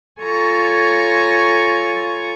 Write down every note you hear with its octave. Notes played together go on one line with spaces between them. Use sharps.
F4 A4 C#5 G#5 A#5 C#6